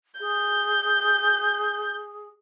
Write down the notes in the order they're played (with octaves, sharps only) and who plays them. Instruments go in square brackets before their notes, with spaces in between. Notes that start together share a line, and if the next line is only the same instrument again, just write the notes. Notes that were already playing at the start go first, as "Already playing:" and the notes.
[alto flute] G#4 [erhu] G6